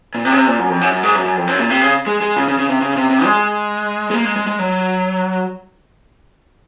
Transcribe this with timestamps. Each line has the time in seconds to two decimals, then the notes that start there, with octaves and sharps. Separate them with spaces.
0.15 A#2
0.25 C3
0.32 C#3
0.36 C3
0.47 A#2
0.59 F#2
0.70 F2
0.81 F#2
0.92 F#2
1.03 G#2
1.15 F#2
1.25 F#2
1.37 F2
1.47 F#2
1.59 A#2
1.70 C3
1.81 C#3
2.07 G#3
2.21 G#3
2.36 C#3
2.48 C#3
2.58 C#3
2.69 C3
2.81 C#3
2.96 C3
3.10 C3
3.25 G#3
4.10 G#3
4.14 A#3
4.25 G#3
4.36 G#3
4.47 G#3
4.59 F#3